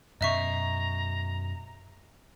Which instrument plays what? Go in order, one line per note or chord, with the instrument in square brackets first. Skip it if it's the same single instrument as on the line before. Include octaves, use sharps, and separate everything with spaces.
[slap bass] F#2 B2 [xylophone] D#5 E5 C#6 [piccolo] A#5